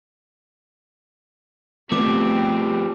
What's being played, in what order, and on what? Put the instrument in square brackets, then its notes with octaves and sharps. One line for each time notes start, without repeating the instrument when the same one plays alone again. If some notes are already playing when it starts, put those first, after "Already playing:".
[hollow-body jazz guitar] F3 B3 [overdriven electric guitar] G3 A3 [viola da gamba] C4 G4 [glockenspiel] D6